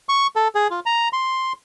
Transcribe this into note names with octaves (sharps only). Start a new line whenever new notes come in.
C#6
A4
G#4
F4
A#5
C6